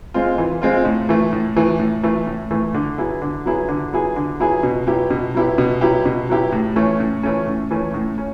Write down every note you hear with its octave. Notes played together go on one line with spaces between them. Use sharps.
G#3 C4 F4
E3
G#3 C4 F4
A2
E3 A3
A2
E3 A3
A2
E3 A3
A2
E3 A3
D3
F#3 B3 E4 G#4
D3
F#3 B3 E4 G#4
D3
F#3 B3 E4 G#4
D3
F#3 B3 E4 G#4
B2
F#3 B3 E4 G4
B2
F#3 B3 E4 G4
B2
F#3 B3 E4 G4
B2
F#3 B3 E4 G4
A2
E3 A3 C#4
A2
E3 A3 C#4
A2
E3 A3 C#4
A2
C#4